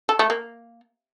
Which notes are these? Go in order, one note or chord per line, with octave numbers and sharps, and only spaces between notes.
A4
A3
A#3